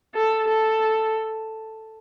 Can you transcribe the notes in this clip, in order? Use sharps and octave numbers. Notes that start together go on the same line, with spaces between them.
A4
A4